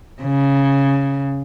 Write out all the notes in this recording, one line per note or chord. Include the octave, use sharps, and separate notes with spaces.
C#3